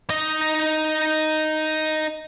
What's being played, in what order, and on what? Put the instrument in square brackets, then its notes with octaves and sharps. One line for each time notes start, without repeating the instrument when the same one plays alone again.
[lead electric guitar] D#4 D#5